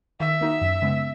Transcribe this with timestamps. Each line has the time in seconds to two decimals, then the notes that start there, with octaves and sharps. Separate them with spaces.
0.20 D#3 E5
0.41 A#3 D#4 F#4
0.61 F#2
0.82 C#3 G#3 B3